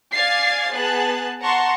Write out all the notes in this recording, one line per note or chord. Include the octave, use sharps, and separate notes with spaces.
D5 F5 G#5 G#6 A6 C7
B3 G#4 A5 F#6
F#5 A5 A#5 C6 C#6